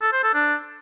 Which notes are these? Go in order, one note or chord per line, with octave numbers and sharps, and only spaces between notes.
A4
C5
A4
D4